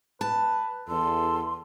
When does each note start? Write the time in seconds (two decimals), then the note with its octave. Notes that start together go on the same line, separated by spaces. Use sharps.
0.21 B4 A5
0.88 E2 A4 C6